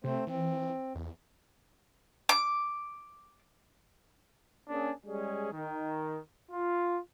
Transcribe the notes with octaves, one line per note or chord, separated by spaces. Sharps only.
C3 A3 C4 C5
E3 C4
E2
D6
A#3 C#4 D4 G#4
G3 G#3 C#4 G#4
D#3
F4